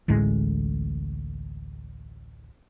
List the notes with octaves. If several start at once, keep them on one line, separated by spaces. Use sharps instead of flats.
A1 D2 A2 G#3